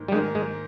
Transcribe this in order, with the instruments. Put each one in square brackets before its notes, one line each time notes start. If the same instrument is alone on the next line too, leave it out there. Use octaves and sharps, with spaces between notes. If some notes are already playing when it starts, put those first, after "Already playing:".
Already playing: [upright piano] G#2 D#3 A#3
[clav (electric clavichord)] G3
[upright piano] G#2 D#3 A#3 [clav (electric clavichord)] G#3
[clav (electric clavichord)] G#3